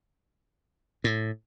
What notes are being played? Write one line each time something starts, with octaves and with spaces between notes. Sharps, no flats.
A2